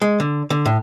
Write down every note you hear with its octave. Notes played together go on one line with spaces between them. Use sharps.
G#3
D3
D3
A2